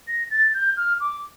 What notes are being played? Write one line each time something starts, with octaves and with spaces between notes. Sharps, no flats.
A#6
A6
G6
F6
D6